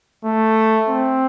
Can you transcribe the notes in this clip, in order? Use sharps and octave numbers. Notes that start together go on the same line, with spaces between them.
A3
C4